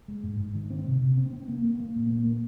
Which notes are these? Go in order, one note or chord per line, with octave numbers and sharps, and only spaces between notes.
G#3
G#2
G#2
D#3
C4
C3
C3
C4
C4
A#3
A#3
A#3
A#2
A#3
A#3